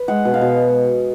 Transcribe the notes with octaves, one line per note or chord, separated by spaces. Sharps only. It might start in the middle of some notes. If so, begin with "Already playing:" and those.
Already playing: B4
G#3 F#5
B2
F5
B2